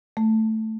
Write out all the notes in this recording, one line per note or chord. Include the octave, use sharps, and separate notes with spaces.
A3